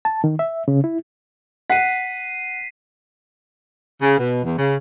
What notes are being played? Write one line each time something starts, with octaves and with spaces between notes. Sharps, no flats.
A5
D#3
E5
C#3
E4
F#5 B6 C7 D#7
C#3
B2
E2
C#3